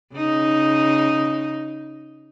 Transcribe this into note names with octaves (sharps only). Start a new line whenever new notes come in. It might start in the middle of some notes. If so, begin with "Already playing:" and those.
C#3 D#4